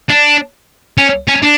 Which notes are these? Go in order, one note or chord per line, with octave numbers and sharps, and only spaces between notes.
D4
C#4
C#4
D4